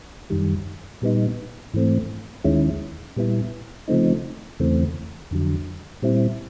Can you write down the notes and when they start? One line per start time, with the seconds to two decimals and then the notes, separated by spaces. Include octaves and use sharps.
0.30 F#2 D#3 G3
1.02 A#2 G3 B3 D#4
1.73 G#2 E3 A3 C4
2.44 D#2 D#3 G#3 C#4 E4
3.16 A#2 G3 B3 E4
3.88 C#3 F3 A3 C4 D#4
4.59 E2 C#3 E3 A3 C4
5.31 F2 D3 F#3
6.02 A#2 G3 C4 E4